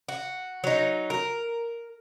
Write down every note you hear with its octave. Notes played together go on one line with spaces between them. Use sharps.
F#4
F#3 D#4
A#4